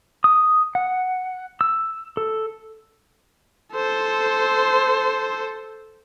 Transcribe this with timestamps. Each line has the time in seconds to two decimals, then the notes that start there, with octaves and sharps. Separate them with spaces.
0.24 D#6
0.75 F#5
1.61 E6
2.17 A4
3.74 A4 C5